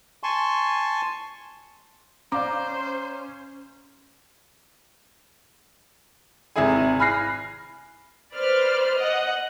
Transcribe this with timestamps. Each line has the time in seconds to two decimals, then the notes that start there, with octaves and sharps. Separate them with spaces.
0.23 G#5 A5 C6 C#6
2.32 C#4 C5 D5 F5 A#5 D6
6.56 G#1 C3 E4 G#4 G#5
6.99 G#5 B5 F6 F#6 A#6 C7
8.34 B4 C5 D5 F6
8.96 D#5 F#5